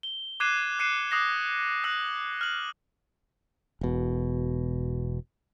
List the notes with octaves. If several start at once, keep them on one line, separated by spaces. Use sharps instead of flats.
G7
D6 F#6 G#6 C7 D#7 E7
F#6 C7 C#7 D#7 E7
D6 D#6 F#6 A#6 C7
E6 F#6 A#6 F#7
F6 F#7
E1 B2